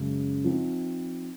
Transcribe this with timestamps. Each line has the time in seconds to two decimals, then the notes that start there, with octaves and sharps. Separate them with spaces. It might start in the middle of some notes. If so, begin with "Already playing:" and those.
Already playing: F#2 C#3 G#3
0.44 F3 C4 D#4